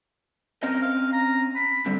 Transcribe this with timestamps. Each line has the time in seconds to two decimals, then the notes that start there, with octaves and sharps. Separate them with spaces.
0.63 C4 C#4 A#4 D#5
0.82 F5
1.12 A#5
1.56 B5
1.86 D3 G3 C4